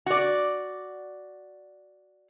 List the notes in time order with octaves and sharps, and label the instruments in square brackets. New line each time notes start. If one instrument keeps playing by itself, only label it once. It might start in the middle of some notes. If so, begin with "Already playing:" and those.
[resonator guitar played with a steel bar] F#4 D5